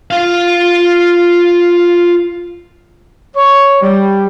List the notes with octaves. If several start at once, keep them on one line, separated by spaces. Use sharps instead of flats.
F4 F5
C#5
G3